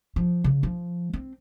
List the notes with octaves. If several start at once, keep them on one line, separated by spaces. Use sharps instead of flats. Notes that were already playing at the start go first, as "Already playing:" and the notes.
F3
C#3
F3
C4